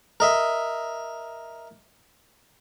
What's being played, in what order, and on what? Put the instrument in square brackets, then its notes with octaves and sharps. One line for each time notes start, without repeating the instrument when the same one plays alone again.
[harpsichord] A#4 D#5 E5